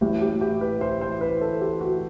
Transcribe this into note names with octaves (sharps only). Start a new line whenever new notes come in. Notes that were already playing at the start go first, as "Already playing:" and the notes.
A1 A2 E3 G4
G4
G4
B4
C5
C5
B4
A4
G4
F#4